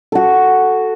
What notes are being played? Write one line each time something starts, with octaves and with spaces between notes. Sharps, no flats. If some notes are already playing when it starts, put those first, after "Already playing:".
F#4 A4